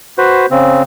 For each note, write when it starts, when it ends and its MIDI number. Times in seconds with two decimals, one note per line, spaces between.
0.18 0.46 66
0.18 0.46 71
0.18 0.46 72
0.51 0.83 49
0.51 0.83 60